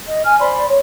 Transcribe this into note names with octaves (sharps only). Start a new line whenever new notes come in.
D#5
G#5 F6
C5 D5 B5 C6
C#5